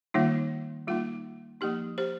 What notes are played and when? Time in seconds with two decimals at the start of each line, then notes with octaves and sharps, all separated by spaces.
0.14 D#3 G3 A#3 D#4 F4
0.88 G3 A#3 D#4 F4
1.61 F3 A#3 D#4 G4
1.98 G4 C5